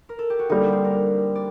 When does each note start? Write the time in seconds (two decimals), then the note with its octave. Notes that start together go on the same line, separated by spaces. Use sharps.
0.09 A#4
0.19 A4
0.30 G4
0.39 F#4
0.49 D3 G3 A#3 D#4
0.61 D4
0.72 C4
0.84 A#4
1.35 D5